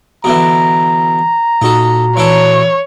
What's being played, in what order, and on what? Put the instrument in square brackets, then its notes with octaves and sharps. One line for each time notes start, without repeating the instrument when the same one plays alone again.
[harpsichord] B2 D3 E3 [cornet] A#5
[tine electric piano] A#2 F#4 [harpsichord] D#4 A4
[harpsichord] E3 D4 A4 [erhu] C#5